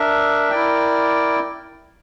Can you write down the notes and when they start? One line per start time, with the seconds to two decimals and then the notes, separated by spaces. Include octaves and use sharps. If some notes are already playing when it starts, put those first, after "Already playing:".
Already playing: D4 A#4 E5
0.50 E4 A#4 D5 G5